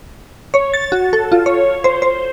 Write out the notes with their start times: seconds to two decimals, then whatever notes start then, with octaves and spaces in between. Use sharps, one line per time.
0.54 C#5
0.74 A6
0.92 F#4
1.13 A4
1.32 F4
1.46 C#5
1.84 C5
2.02 C5